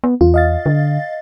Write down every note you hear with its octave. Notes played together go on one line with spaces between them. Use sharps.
B3
E2 F4
D#5 F5 A6
D3